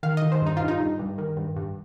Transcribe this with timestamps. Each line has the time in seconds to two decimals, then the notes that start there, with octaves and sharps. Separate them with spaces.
0.03 D#3 F5
0.17 D#5
0.22 D#3
0.32 C5
0.42 G2 D#4
0.57 G2 F4
0.68 D#4
0.80 G2
0.99 G2
1.18 D#3
1.37 G2
1.56 G2